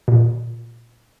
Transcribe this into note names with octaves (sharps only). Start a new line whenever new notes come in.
A#2